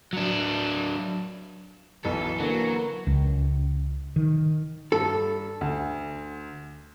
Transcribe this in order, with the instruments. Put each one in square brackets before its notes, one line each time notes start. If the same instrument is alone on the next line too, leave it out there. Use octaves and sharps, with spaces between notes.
[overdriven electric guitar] F#3 D4
[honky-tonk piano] B1 [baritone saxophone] E3 [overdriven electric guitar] A4
[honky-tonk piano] D3 [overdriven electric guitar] F#3 [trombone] A#3
[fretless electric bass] C#2
D#3
[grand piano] G2 [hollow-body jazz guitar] A4
[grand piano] D2